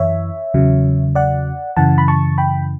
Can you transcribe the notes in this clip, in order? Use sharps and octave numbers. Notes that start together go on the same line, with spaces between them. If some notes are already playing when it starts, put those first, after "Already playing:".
Already playing: F#2 E3 C#5 E5
E2 C#3 F#3
D5 F#5
F#2 C#3 E3 F#5 A5
B5
A5 C#6
G5 B5